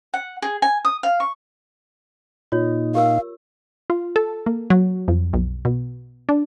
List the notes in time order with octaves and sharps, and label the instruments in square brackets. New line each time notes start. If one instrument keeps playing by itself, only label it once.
[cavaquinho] F#5
G#4
G#5
D#6
F5
C#6
[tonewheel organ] A#2 D#4 [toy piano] F4 C#5
[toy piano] G4 A#4 E6 [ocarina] F5
[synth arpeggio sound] F4
A4
A#3
F#3
F2
B1
B2
D4